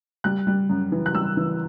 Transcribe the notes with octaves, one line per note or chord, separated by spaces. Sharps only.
G3 F#6
G3
F#2
E3
F#6
G3 E6
E3